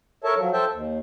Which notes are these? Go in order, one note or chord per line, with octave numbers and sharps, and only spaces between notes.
A4 A#4 C#5 E5 A5
F3 F#3
A4 C5 E5 G5 A5
D#2